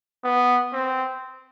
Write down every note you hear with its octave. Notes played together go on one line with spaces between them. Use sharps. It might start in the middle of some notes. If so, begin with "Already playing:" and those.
B3
C4